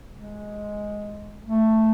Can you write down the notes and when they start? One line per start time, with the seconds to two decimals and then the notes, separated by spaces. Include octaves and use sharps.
0.14 G#3
1.45 A3